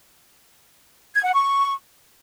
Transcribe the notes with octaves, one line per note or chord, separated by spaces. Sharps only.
G#6
F#5
C#6